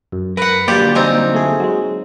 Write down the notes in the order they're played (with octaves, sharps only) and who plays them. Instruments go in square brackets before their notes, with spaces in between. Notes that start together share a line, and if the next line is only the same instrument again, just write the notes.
[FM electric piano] F#2
[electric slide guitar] A#4 [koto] B4 F#5
[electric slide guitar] D3 F#3 A#3 [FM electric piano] G3 D5 [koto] F4 G4
[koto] C4 D#4 G#5
[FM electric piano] A3 G#4
F#3 G#3